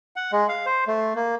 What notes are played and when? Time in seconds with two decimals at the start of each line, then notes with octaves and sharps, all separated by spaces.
0.16 F#5
0.32 G#3
0.49 F5
0.66 C5
0.87 A3
1.16 A#3